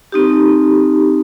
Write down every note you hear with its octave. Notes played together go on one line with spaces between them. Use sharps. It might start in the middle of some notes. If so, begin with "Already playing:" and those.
C4 D#4 G4